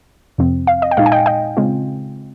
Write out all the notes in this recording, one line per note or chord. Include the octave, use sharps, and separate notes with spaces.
F2 C3 F3 C4
F5
D#5
G5
A#2 G#3 D#4 F5
G#5
D#5 G5
D#5 G5
C#3 G#3 C4 F4